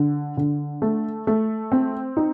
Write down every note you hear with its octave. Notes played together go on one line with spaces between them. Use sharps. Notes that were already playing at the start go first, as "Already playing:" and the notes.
Already playing: D3
D3
A3
A3
C4
D#4